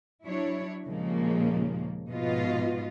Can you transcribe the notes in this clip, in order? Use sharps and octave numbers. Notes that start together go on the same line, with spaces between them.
F#3 D4 E4 C#5
D#2 A#2 C#3 F3 G#3 A#3
G#2 B2 F3 B3 F4 D#5